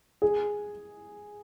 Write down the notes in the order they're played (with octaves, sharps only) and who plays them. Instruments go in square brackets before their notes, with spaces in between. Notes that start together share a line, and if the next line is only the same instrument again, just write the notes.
[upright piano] G#4